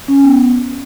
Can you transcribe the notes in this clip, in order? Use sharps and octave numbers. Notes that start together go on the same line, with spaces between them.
C#4
B3